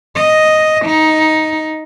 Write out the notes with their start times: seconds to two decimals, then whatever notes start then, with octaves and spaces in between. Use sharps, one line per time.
0.16 D#5
0.86 D#4